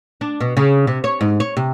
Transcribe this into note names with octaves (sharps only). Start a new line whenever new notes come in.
D4
B2
C#3
C3
C#5
G#2
C#5
C3